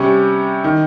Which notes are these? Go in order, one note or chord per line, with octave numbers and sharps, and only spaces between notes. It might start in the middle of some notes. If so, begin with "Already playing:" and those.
Already playing: C3 G3 C#4
D#3